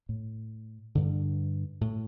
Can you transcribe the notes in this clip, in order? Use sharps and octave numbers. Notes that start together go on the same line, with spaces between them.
A2
G2 D3
A2